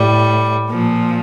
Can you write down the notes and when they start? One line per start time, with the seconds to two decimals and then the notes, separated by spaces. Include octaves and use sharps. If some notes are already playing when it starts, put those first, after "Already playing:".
Already playing: A2 G3
0.69 A#2 F3